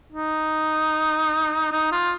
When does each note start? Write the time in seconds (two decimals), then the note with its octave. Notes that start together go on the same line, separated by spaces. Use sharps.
0.13 D#4
1.72 D#4
1.92 F4